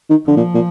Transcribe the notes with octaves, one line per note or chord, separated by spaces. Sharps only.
D#3
D3 F3
A#2
A#2